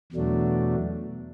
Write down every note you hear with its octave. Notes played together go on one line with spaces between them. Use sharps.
E2 B2 F#3 A3 D4